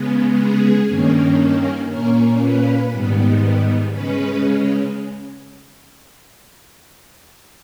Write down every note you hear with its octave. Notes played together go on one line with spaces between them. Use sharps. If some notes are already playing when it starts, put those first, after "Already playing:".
Already playing: C#3 G#3 B3
G#4
G2 D#3 A#3 C#4
A#2 A#3 C#4 A#4
B4
G#2 D#3 G3 B3
C#3 G#3 C#4 B4